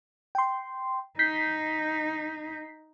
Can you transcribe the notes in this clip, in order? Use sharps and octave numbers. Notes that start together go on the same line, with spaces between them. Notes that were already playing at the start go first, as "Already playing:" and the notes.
G5 C6
D#4 G6 B6 C7